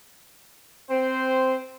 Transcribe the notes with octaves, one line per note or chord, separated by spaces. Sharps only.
C4 C5